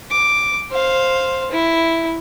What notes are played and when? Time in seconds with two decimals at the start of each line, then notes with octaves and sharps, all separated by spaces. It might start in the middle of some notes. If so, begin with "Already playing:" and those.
0.12 D6
0.71 C5 F5
1.52 E4